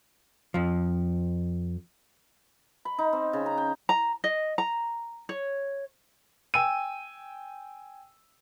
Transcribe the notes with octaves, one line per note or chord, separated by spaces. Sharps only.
F2 F3
B5
D#4
C4
C#3
A#5
G5
A#5
D#5
A#5
C#5
G5 G#5 E6 D#7